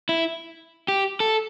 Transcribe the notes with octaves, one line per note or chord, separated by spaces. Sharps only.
E4
G4
A4